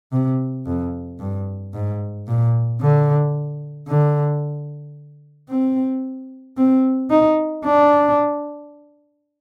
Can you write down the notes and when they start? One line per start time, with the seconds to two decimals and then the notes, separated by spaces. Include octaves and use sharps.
0.12 C3
0.66 F2
1.19 G2
1.74 G#2
2.28 A#2
2.81 D3
3.88 D3
5.49 C4
6.57 C4
7.10 D#4
7.65 D4